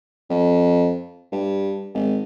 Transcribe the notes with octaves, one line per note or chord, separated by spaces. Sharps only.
F2
G2
G#1